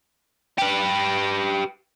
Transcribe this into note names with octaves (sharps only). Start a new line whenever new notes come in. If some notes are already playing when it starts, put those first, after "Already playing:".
G4 B4